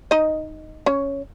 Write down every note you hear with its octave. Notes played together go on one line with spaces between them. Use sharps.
D#4 D#5
C#4 C#5